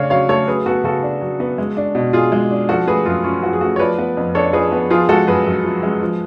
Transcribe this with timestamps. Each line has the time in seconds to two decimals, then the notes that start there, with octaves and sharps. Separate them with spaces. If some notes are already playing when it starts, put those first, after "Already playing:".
Already playing: C#3 A3 D4 C#5 F5
0.10 F#3 C#5 F5
0.29 A3 A4 C#5
0.47 F#3 G#4 B4
0.66 B3 F#4 A4
0.84 C#3 F#4 A4
1.03 D4
1.21 F#3
1.40 B3
1.58 G#3
1.77 D4
1.95 B2
2.13 B2 F4 G#4
2.32 G#3
2.51 D4
2.69 F3 F#4 A4
2.87 A3 G#4 B4
3.06 F#2 F4 G#4
3.24 C#4 F4
3.43 F3 F#4
3.53 G#4
3.61 A3 F#4
3.76 C#5
3.79 F3 B4 D5
3.99 B3
4.17 F2
4.35 D4 A4 C#5
4.53 F3 G#4 B4
4.72 B3
4.90 F3 F4 G#4
5.09 G#3 F#4 A4
5.27 F#2 G#4 B4
5.46 F#2
5.64 F3
5.83 G#3
6.02 F3